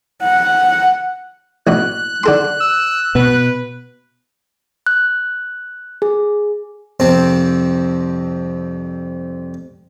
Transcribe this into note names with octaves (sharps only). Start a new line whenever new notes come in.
F#5
A1 B2 F#6
D3 A4 C6
E6
B2 B3 B4
F#6
G#4
C2 F2 C4 A5